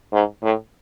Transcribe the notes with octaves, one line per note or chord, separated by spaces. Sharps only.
G#2
A2